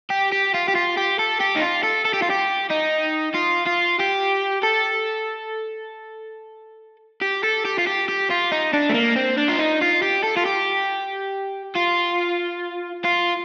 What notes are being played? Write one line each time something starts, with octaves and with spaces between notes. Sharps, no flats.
G4
G4
F4
G4
F4
G4
A4
G4
D#4
F4
A4
A4
G4
F4
G4
D#4
F4
F4
G4
A4
G4
A4
G4
F4
G4
G4
F4
D#4
D4
A3
A#3
C4
D4
F4
D#4
F4
G4
A4
F4
G4
F4
F4